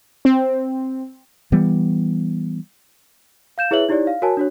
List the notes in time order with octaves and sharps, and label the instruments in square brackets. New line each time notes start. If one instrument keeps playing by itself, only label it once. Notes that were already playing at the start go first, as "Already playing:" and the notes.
[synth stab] C4
[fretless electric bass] E3 G3 B3
[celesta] F5 G6 E7
E4 G#4 B4 C#5 E5 F#7
D#4 E4 G4 C#5 D5
F5
F#4 A#4 C#5 G#5 A5
D4 F#4 C#5